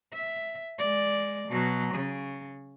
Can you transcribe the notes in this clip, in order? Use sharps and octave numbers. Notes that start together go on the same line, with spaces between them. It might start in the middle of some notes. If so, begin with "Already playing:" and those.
E5
G#3 D5
B2 F#3
C#3